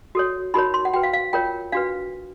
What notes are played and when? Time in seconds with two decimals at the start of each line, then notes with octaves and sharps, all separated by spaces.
0.15 F#4 A4 C#5
0.54 D#4 F#4 A#4 C#5 B5
0.74 C6
0.85 F#5
0.93 F#4 G5
0.96 B4
1.03 F5
1.13 F5
1.33 F4 A#4 C#5 G5
1.72 D4 F#4 B4 F5